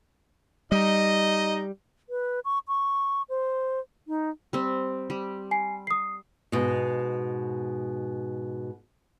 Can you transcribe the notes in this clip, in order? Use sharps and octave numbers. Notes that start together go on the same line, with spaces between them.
G3 D#4 D#5
B4
C#6
C#6
C5
D#4
G3 C4
G3
G#5 C7
D#6 C7
G#2 B2